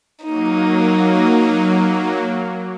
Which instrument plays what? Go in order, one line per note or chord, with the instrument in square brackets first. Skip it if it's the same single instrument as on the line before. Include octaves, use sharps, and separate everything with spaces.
[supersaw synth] F#3 A#3 [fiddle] D#4